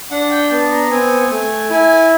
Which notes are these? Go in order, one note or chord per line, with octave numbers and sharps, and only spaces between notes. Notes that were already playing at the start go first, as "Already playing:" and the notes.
D4 F#5
G5
B3 A5
A#5
C4 G#5
A3 G#5
E4 G#5